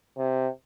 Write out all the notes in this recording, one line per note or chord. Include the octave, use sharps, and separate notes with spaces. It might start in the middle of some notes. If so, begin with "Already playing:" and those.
C3